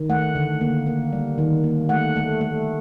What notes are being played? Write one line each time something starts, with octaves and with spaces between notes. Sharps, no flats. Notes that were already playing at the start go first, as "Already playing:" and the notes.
Already playing: D#3
A3 F#5
D3
A#3
A#3
G3
D#3
A#3
A3 F#5
A3
A3